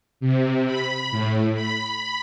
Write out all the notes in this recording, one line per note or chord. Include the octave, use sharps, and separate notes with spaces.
C3
B5
A2
B5